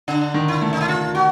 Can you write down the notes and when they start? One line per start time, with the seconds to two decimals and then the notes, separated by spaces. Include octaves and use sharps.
0.08 D3 D4
0.34 D#3
0.48 E4
0.62 A3
0.73 D#4
0.81 E4
0.88 F4
1.15 F#4